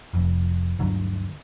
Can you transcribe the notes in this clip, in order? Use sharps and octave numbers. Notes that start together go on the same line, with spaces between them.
F1 F2
D2 G2 D3 F#3